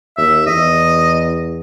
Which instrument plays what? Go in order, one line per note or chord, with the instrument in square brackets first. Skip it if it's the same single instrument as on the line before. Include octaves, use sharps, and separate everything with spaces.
[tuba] D#2 [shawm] E5
[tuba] E2 [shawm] D#5